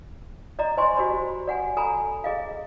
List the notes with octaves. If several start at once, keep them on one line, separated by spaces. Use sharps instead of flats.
D5 D#5 A#5
C5 D#5 G#5 C6 C#6
F#4 G4 C5 D5 B5
D5 F#5 G#5
A4 G#5 A#5 B5
G#4 D#5 F5